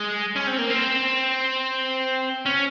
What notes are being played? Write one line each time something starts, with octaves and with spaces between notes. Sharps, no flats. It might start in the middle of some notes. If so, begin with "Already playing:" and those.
Already playing: G#3
C#4
C4
A#3
C4
C#4